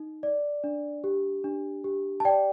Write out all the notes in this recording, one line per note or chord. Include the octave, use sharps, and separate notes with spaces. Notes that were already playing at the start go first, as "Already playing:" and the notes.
Already playing: D#4
D5
D4
G4
D4
G4
A5
D5 G5